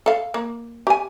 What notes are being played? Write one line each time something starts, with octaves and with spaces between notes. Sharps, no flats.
A4 F5
A#3
G4 G#5